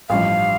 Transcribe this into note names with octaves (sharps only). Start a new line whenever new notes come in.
A1 G2 F3 F5